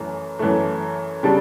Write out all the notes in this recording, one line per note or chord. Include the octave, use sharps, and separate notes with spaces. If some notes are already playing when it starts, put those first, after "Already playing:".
Already playing: F#2 E3 A3
F#2 E3 A3
C#3 G3 D4 A4